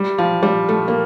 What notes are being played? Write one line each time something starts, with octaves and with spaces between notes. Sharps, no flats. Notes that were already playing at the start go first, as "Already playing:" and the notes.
Already playing: G3
F3
G3
A3
A#3